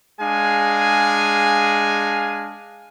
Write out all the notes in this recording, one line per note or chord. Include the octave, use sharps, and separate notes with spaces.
G#3 D4 G#4 F5 G#5